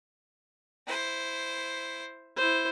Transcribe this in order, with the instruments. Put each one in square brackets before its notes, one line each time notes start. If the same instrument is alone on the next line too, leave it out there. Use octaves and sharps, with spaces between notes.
[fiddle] E4 C5
[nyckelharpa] E4 C5